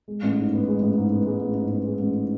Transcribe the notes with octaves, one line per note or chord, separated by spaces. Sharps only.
G#3
A1
G#2
B3
G#3
A1
G#2
B3
G#3
A1
G#2
B3
G#3
A1